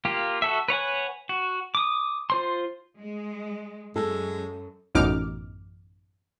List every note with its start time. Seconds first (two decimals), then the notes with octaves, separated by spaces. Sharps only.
0.05 A#3 F4 G4
0.42 F#4 A4 E5
0.68 B4 C#5 F#5 G#5
1.29 F#4
1.75 D6 D#6
2.30 F4 C5 C6
2.99 G#3
3.96 F#2 G#3 A4
4.95 A1 F#2 B2 D#4 D6 F6